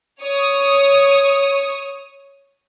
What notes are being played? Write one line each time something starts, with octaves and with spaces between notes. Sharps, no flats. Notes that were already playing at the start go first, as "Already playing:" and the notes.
C#5 D#6